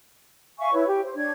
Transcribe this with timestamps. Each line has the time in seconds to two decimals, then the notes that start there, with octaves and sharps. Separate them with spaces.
0.59 E5 F5 G#5 C#6
0.73 E4 B4 C#5
0.87 G4
1.02 C5
1.15 D4 C#5 G#6